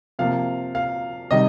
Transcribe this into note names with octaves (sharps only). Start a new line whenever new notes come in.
C3 F3 A#3 F5
F5
C3 D#3 G3 D#5